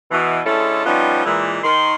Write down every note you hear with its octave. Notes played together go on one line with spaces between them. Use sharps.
B2 E3
D3 G#3 C#4 E4 A4 A5
F3 G3 B3 C#4 D#4 F4
A#2 E3 G#3
D#3 C6